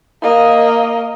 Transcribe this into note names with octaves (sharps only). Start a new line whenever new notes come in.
A#3 D#5